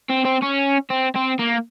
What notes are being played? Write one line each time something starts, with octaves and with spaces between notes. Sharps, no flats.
C4
C4
C#4
C4
C4
A#3